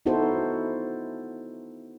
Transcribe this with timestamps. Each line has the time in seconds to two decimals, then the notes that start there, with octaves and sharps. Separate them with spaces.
0.06 B3 D#4 E4 F#4 A4 C5